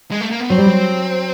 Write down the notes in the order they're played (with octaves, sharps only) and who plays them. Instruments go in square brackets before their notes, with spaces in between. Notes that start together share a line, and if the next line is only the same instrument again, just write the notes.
[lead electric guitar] G#3
A3
A#3
B3
[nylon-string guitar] F#3 [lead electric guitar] C4
[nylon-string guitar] G3
F#3